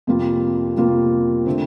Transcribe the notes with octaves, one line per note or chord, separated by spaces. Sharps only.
F2 C3 G3 A#3 F4
F2 C3 G3 A#3 F4
D3 A3 C4